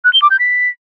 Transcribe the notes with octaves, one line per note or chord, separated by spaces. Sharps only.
F#6
G7
D6
G6
B6